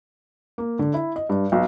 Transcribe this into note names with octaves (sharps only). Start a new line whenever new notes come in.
A#3
D3
E4
D#5
G2
B1